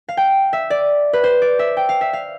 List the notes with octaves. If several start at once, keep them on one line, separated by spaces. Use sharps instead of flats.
F5
G5
E5
D5
B4
C5
D5
E5
G5
F5
E5
F5